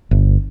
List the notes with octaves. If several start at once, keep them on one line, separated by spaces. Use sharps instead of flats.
G1